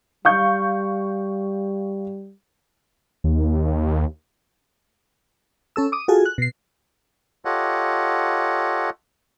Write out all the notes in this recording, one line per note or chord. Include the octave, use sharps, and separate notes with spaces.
G3 F5 C#6 G6
D#2
C#4 A4 E6
D6 D#6
F4 F#4 G#4 A4 G#5
F#6
B2 C7
F4 G4 A4 C#5 D#5 F#5